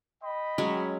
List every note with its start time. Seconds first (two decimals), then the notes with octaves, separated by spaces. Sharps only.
0.22 D#5 G5 B5
0.58 F#3 G#3 C#4